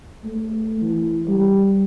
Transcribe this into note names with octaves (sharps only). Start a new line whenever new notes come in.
A3
E3
G3